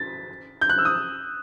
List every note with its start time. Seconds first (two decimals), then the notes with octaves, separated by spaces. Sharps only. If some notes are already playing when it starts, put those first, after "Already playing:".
Already playing: A6 B6
0.61 G6
0.70 F#6
0.78 E6
0.85 D#6